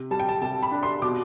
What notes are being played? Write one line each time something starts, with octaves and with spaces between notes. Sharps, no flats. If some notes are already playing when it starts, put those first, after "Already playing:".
Already playing: C3
G3 A5
G5
A5
C3 A5
B5
D4
C6
B2 D6